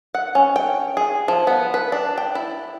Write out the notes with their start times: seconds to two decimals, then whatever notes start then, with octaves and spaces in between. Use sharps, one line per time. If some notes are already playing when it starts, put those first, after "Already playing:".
0.15 F#5
0.35 C#4
0.56 G5
0.97 G#4
1.28 F3
1.47 B3
1.74 B4
1.92 D4
2.18 G5
2.35 E4